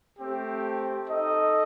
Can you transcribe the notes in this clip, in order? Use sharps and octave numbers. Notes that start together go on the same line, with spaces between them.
A3 C4 G4
D#4 A4 D#5